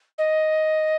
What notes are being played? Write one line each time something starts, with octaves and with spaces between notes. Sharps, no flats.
D#5